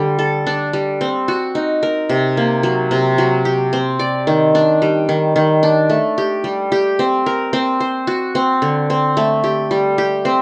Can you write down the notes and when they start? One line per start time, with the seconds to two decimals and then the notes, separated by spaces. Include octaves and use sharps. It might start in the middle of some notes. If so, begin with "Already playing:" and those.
Already playing: D3 G3
0.19 A4
0.47 D4
0.73 G3
1.01 C4
1.28 F#4
1.55 D#4
1.83 A#4
2.09 C3
2.37 A#3
2.63 F#3
2.91 C3
3.18 F#3
3.45 G4
3.73 C4
3.99 D5
4.27 D#3
4.55 D4
4.82 G3
5.09 D#3
5.36 D#3
5.63 D4
5.90 A3
6.18 G4
6.44 G3
6.72 G4
6.99 C4
7.26 A#4
7.53 C4
7.80 C5
8.07 F#4
8.35 C4
8.62 D3
8.90 C4
9.17 A3
9.44 G4
9.71 G3
9.98 G4
10.25 C4